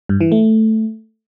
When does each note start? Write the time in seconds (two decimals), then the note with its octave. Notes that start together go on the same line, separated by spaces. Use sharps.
0.09 G2
0.21 E3
0.32 A3